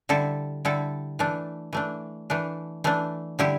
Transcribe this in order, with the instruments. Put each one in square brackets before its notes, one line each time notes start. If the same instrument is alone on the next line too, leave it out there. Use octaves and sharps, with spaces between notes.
[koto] D3 G3 E4 A4
D3 G3 E4 A4
E3 A3 D4
E3 A3 D4
E3 A3 D4
E3 A3 D4
D3 G3 E4 G4